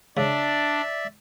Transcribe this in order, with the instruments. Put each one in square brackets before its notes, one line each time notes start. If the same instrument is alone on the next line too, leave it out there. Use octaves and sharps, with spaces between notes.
[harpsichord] C#3 [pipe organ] D4 [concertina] D5 E5